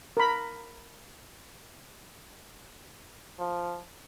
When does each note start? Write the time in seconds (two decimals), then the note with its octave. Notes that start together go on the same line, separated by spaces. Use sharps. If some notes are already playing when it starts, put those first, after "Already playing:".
0.17 A#4 B5
3.39 F3